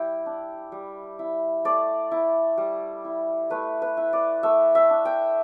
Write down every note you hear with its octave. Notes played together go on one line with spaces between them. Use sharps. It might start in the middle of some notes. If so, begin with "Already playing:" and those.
Already playing: G3 E4 G5
D4
G3
E4
A3 D5
E4
G3
E4
A3 B4
B4
E4
D5
A3 E5
E5
D4
G5